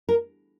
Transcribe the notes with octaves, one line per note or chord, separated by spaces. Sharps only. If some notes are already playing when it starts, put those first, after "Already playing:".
A#4